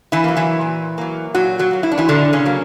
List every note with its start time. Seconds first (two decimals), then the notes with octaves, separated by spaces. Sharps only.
0.12 E3 E4
0.24 F#3 A#3
0.37 E3 E4
0.61 A#2
0.98 F#3 A#3
1.34 A#2 F#3 F#4
1.59 F#3 F#4
1.71 F#3 A#3
1.83 E4
1.92 D4
1.98 E3 E4
2.08 A#2 D3 D4
2.33 C#3 C#4
2.46 F#3 A#3